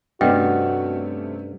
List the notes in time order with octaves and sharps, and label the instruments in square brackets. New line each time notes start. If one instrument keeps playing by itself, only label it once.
[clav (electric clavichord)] G2 [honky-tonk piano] C3 A3 C#4 [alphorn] F#4 [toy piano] D#5 F#5 G5